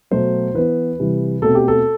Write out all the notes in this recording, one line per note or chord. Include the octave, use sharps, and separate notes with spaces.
B2 F#3 A3 C5
E3 B3 B4
C3 E3 G3
B2 A3 C4 A4
G4
A4